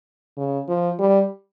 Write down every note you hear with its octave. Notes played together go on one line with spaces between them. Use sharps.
C#3
F3
G3